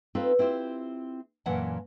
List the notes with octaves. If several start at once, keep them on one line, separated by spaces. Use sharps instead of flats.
C4 D#4 F4 A4 B4
C4 E4 F4 G4
F#2 A#2 E3 C#4 F#5 A5